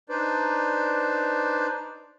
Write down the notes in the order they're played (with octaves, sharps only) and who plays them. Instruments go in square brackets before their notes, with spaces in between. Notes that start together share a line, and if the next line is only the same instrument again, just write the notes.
[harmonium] D4 D#4 B4 C5 D5